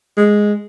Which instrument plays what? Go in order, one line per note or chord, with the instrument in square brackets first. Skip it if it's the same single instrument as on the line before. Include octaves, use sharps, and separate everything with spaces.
[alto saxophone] G#3